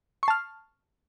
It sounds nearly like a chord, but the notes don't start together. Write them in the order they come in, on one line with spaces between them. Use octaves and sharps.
C#6 C7 A5 F6